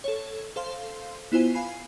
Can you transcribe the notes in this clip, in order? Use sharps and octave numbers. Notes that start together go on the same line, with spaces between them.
A4 C#5
A4 C5 F5 C6
B3 E4 F4 C5 G#5 D#7
F5 G#5 B5 C7